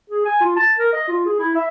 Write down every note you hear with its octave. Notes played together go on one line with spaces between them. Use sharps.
G#4
G#5
F4
A5
A#4
D#5
F4
G#4
E4
E5